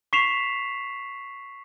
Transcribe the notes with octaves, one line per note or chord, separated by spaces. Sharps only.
C#6 B6 C7 E7 F7